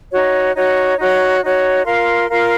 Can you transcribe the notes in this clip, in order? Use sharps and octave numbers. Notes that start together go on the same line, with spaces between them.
D#4 F#4 C#5
D#4 F#4 C#5
D#4 F#4 C#5
D#4 F#4 C#5
F4 A#4 F5 C6
F4 A#4 F5 C6